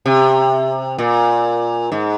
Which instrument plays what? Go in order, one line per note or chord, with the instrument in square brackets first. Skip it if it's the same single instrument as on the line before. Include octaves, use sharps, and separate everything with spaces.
[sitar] C3
A#2
G#2